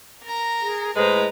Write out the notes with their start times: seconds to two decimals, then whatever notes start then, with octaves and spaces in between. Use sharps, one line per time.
0.24 A#4 A#5
0.61 G#4
0.96 A2 G#3 B4 C5 A#5